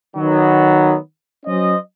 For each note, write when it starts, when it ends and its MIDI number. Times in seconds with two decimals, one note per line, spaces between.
0.17 0.96 51
0.17 0.96 54
0.17 0.96 59
1.46 1.76 54
1.46 1.76 61
1.46 1.76 72
1.46 1.76 75